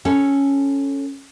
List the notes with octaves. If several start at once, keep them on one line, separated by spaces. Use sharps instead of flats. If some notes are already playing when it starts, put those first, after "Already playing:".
C#4 A4